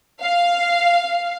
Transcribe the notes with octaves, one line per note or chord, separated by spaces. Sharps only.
F5